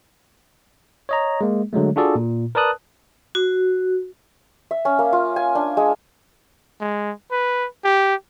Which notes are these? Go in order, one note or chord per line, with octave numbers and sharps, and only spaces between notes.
C#5 D#5 A#5
G#3 A#3
D3 F#3 G#3 A3
D4 F4 F#4 G#4 A4 D5
A#2
A#4 B4 D5 A5 D#6 F#6
F#4
E5
C#4
A#3
F4
G#5
D4
G#3
G#3
B4
G4